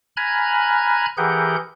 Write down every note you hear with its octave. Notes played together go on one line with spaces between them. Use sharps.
G#5 A#5 B5 F6 F#6 G#6
E3 G4 G#4 A#4 F#5 G6